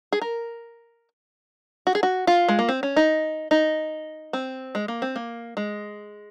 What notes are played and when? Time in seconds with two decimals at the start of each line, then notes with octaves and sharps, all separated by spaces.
0.13 G#4
0.22 A#4
1.87 F#4
1.95 G#4
2.03 F#4
2.27 F4
2.48 G#3
2.59 A#3
2.69 C4
2.83 C#4
2.96 D#4
3.51 D#4
4.33 C4
4.75 G#3
4.88 A#3
5.02 C4
5.16 A#3
5.57 G#3